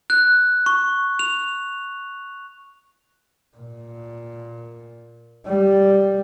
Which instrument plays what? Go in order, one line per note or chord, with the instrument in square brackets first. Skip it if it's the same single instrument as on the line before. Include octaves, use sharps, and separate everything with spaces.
[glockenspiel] F#6
C#6
F7
[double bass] A#2
G3